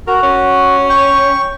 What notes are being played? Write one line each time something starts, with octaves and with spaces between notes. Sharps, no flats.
F#4 A#4
C#4
G5 C#6